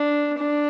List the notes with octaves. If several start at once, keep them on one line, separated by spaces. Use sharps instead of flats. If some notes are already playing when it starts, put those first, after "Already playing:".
Already playing: D4
D4